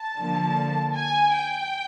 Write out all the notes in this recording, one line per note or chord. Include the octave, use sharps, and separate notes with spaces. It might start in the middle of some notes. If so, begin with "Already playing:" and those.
Already playing: A5
D3 F3 A#3
G#5
G5